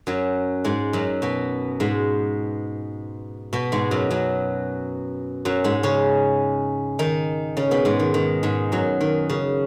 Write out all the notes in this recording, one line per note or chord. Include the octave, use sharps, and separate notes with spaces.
F#2 F#3
G#2 G#3
F#2 F#3
B2 B3
G#2 G#3
B2 B3
G#2 G#3
F#2 F#3
F#2 F#3
F#2 F#3
G#2 G#3
C#3 C#4
D#3 D#4
C#3 C#4
B2 B3
G#2 G#3
D#3
D#3
G#2 G#3
F#2 F#3
D#3
C#3